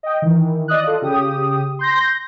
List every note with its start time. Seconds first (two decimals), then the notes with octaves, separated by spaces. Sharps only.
0.03 D#5 G5
0.22 D#3 E3
0.68 D5 D#5 D#6 F#6
0.83 F4 A4
1.02 C#3 G4 D#6
1.79 C6 G6 A#6